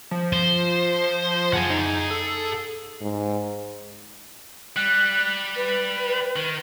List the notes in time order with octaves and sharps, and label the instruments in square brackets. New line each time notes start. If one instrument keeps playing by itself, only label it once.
[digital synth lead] F3
[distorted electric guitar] C5
G#4 F#5
[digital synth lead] D#4
A4
[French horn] G#2
[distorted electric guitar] G3 [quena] F#6
[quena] B4
[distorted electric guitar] D#3